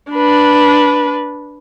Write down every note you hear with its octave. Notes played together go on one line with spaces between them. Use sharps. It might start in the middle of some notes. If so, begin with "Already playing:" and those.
D4 B4